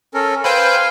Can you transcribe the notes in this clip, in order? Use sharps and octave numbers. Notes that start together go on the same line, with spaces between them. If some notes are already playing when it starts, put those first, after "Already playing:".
C#4 A4 A#4
B4 C5 F5 G5 G#5